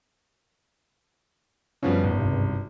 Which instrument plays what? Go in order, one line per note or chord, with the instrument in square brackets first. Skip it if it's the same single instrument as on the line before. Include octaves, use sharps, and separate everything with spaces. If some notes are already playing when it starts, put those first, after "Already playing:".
[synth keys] F#2 B3 C#4 [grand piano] C#3 F3 G3
[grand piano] G#1
[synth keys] C#2 G2 C3